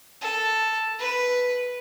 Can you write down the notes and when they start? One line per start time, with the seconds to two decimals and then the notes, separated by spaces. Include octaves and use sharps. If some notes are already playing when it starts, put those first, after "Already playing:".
0.21 A4
0.99 B4